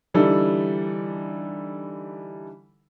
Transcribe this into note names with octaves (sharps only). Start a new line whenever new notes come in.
D3 E3 G3 D#4 A4